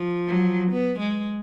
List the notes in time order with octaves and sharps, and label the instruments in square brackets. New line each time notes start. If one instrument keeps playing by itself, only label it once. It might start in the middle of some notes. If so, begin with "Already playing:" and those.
Already playing: [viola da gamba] F3
[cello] F#3
[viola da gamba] B3
G#3